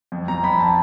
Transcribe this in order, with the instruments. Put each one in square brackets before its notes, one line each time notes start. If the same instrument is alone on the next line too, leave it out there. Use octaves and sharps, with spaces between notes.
[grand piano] F2
F2 A#5
F2 B5
A5